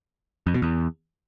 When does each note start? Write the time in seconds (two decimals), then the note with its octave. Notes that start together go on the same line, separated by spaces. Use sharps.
0.47 F2
0.54 B2
0.62 E2